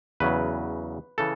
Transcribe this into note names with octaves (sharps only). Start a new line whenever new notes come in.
E2 C#3 F#3 B4
C#3 E3 A4